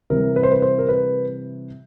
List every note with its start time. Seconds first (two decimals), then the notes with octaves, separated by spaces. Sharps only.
0.10 C3 E3 G3 A#4
0.36 B4
0.43 C5
0.51 B4
0.62 C5
0.78 A#4
0.89 B4